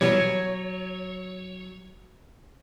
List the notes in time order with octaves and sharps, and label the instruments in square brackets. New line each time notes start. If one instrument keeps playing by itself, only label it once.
[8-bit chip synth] B2 E3 G3 [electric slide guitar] F#3 C#5